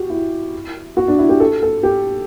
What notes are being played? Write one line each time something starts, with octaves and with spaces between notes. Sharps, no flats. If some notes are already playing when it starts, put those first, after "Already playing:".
Already playing: F#4 G4
E4
F#4
D4
E4
G4
A4
A4
G4